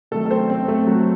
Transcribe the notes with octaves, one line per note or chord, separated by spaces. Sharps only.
C3 D#3 F#3 A3 A4
A4
C4 C5
C4 C5
A3 A4
F#3 F#4